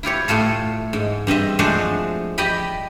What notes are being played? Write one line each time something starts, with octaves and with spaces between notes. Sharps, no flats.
E4 F4 G4 C#5
A2 A3 F4 A4
G#2
G2 C4 D#5 E5
F3 G#3 A3 D4 F#4 C5
G4 D5 D#5 G5 B5